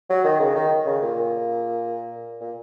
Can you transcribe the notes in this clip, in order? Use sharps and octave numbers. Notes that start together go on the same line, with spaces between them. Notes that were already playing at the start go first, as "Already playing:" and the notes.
F#3
D#3
C#3
D#3
C#3
A#2
A#2